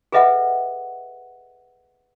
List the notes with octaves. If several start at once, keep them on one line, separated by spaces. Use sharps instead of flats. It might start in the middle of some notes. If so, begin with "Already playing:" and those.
G#4 A4 B4 D#5 E5 F#5